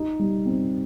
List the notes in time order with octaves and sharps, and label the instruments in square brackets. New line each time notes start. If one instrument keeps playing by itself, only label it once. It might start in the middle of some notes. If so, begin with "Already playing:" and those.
Already playing: [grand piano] D#4
G3
C4